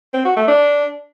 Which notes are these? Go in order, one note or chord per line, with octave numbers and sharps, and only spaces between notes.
C4
F#4
A3
D4